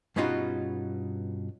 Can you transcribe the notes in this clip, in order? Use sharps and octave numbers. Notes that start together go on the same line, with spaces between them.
G2 B2 C#4 D#4 F4 F#4